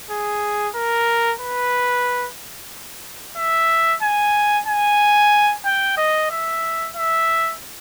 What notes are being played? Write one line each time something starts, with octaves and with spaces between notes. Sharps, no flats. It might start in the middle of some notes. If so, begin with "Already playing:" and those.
G#4
A#4
B4
E5
G#5
G#5
G5
D#5
E5
E5